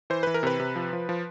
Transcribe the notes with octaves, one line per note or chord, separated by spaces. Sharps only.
E3 C5
E3 B4
A#4
C3 B4
C3
F3
F3
F3